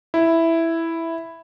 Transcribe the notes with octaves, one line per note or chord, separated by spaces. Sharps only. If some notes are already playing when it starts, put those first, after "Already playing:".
E4